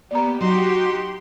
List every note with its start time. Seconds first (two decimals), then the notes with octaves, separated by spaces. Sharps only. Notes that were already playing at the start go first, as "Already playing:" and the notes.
0.11 A#3 B3 G4 D5 A#5
0.41 F#3 D#4 F#4 G4 C6